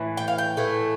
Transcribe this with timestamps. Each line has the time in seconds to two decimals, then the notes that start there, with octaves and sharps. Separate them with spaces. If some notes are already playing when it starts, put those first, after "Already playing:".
Already playing: A2 E3
0.17 G5
0.28 F5
0.38 G5
0.57 A2 E3 A3